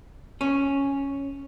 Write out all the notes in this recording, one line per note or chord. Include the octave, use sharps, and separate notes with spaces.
C#4